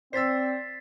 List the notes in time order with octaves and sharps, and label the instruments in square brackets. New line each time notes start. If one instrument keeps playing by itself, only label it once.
[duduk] C4 [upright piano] C5 E6 [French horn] D5 [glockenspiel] A6 B6 C7